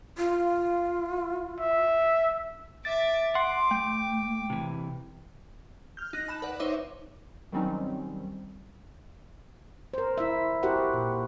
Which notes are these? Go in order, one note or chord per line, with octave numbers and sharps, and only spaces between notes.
F4
E5
E5 D6 A6
F#5 C6 D6
A3 G5
C3 E3
F6 G6
D#4 F#6 A#6
A5 B5 F#6 E7
B4 D5 F#5
D#4 C5 C#5 E5 D6
D#3 F#3 G3 C4 C#4 D#4
A#4 C5
E4 E5
E4 F#4 G4 A#4 C5 F#5
A#2